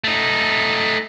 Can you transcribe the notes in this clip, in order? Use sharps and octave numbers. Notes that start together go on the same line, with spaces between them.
A3 D#4